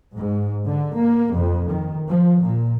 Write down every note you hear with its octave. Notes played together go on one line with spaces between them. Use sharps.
G#2
D3
A#3
F2
D#3
F3
A#2